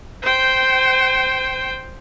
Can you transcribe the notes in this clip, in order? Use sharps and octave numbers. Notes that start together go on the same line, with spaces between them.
C5 G5